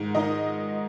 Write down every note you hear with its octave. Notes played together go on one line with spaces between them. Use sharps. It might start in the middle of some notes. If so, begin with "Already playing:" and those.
Already playing: G#2 D#3
D#3 D#5